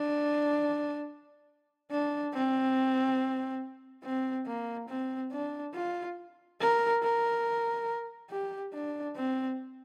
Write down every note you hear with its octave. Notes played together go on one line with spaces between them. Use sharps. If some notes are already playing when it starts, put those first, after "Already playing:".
Already playing: D4
D4
C4
C4
A#3
C4
D4
F4
A#4
A#4
G4
D4
C4